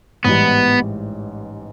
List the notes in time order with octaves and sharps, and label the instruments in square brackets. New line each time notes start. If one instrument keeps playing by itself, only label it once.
[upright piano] A1 G#2 E3 G3 [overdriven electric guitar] B3